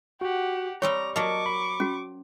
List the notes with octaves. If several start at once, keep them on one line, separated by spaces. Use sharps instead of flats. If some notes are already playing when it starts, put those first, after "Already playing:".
F#4 G4 F#5
G3 C4 G4 C#5 A#5 C#6 D6
F#3 A#3 D#5 A5 C#6 D6 C#7
B5
C#4 F#4